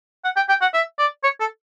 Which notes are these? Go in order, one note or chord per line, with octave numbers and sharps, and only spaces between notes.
F#5
G5
G5
F#5
E5
D5
C#5
A4